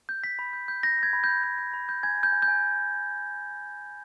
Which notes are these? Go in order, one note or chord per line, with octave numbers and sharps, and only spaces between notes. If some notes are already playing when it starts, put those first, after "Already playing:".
G6
G6 B6
B5
G6
G6
G6 A#6
G6 G#6
B5
B5 G6
G6
G6
B5
G6
G#5 G#6
G#5
G6
G#5
G6
G#5